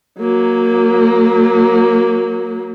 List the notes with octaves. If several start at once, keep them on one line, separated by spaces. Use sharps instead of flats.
F#3 A#3